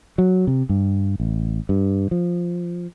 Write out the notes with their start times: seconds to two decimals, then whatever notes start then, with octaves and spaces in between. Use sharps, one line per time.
0.18 F#3
0.47 C3
0.69 G2
1.20 A1
1.69 G2
2.11 F3